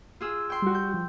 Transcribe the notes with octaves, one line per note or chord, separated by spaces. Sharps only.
F4 G#4 E6
G5 C6
G3 F#4
G6
F3